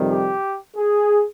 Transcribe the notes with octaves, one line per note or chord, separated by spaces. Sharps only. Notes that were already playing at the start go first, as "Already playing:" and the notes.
Already playing: F2 C3 D#3 G3
G4
G#4